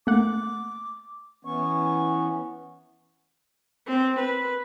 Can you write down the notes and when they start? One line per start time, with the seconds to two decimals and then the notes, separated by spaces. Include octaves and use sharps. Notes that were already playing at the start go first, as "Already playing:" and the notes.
0.07 A3 A#3 F#5 D6
1.45 E3 B3 C#4 C#6
3.87 C4
4.19 B4